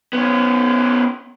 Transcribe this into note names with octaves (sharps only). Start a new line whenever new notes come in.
B3 C#4